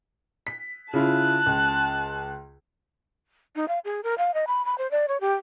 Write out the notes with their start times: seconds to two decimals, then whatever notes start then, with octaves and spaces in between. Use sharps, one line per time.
0.47 B6
0.94 C#3 E4 F4 A5 F#6
1.46 C#2
3.56 D#4
3.68 F5
3.85 G#4
4.04 A#4
4.18 F5
4.34 D#5
4.47 B5
4.65 B5
4.78 C5
4.91 D5
5.08 C#5
5.21 G4